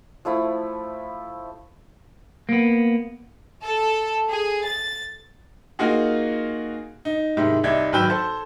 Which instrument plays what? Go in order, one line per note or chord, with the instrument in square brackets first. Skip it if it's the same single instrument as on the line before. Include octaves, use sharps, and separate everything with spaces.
[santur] F3 A3 E4
[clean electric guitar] A#3 B3
[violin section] A4
G#4
A6
[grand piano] A#3 D#4 F4 F#4 G#4
D#4
G#2 C3 D#3 E4
C2 D#4 D5 E5 G#6
G#1 F#3 B4 G5 E6 G6
A4 C5